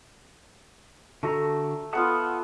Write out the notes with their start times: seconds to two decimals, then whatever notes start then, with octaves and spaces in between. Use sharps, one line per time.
1.23 D3 A3 F#4 A#5
1.93 A3 B3 F4 F#5 A5 D#6